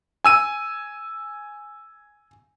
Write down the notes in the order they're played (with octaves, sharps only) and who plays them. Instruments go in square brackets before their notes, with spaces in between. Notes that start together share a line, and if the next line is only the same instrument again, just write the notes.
[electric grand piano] G#5 E6 D#7